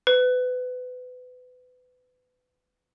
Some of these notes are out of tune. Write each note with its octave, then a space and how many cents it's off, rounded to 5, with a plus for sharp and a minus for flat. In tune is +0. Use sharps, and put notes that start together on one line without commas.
B4 +30